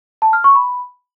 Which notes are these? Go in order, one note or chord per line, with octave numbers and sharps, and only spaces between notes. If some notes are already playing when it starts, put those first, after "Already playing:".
A5
F6
C#6
B5